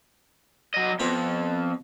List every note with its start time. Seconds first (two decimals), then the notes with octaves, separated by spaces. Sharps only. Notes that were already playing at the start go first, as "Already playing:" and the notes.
0.74 F#3 D#5
1.00 F2 B3 C4 F4